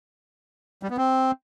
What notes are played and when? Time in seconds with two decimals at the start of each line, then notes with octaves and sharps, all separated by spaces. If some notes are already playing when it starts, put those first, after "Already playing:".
0.83 G3
0.90 B3
0.97 C4